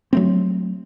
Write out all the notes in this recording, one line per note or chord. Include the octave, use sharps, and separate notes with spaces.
F#3 A3 C4